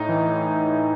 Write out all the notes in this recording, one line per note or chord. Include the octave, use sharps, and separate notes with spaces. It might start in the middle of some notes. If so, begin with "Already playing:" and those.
Already playing: A2 D#4
E3